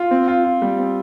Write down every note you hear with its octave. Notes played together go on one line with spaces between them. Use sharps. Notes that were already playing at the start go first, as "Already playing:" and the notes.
Already playing: F4
C4
F4
F4
G3
C4